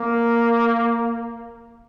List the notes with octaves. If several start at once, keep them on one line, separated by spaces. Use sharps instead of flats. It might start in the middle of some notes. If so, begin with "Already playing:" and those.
Already playing: A#3